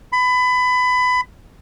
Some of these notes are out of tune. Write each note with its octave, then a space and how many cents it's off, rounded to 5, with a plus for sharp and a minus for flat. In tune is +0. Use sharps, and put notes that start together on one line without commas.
B5 +25